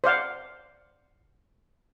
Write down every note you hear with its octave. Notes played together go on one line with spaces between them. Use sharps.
C5 D5 F5 F#5